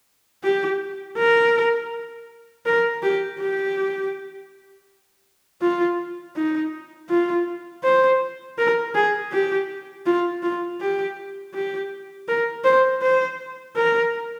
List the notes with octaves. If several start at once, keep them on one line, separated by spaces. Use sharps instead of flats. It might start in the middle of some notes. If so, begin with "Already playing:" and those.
G4
A#4
A#4
G4
G4
F4
D#4
F4
C5
A#4
G#4
G4
F4
F4
G4
G4
A#4
C5
C5
A#4